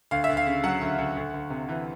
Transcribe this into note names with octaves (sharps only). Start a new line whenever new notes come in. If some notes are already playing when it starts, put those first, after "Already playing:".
D2 F5
E5
D2
F5
C#3
F#3 F#5
D2
D2
D2
D2
C3
E3